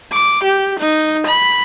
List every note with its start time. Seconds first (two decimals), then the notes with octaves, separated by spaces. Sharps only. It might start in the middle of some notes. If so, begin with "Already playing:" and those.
0.12 D6
0.44 G4
0.79 D#4
1.27 B5